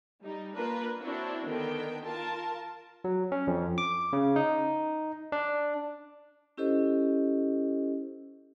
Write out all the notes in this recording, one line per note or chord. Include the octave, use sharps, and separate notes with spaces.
G3 D#4
A#3 D4 F4 A#4 B4
C4 D4 E4 F#4 C#5
D3 D#3 B3 G5
F4 A#4 A5
F#3
C#4
F2
D6
C#3
D#4
D4
C#4 E4 G4 A4 C5 D#5